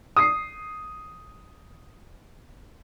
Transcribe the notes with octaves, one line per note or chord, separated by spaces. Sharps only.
D#6 C7